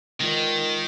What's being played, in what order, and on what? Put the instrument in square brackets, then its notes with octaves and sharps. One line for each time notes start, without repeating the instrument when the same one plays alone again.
[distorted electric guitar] D#3 [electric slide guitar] G#3 F4 A#4 D#5